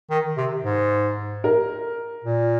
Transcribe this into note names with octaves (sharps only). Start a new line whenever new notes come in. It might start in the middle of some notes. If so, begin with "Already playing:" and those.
D#3
C3
G#2
A#4
A#2